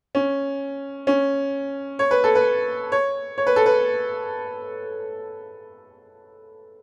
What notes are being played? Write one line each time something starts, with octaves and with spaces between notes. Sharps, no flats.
C#4
C#4
C#5
B4
A4
B4
C#5
C#5
B4
A4
B4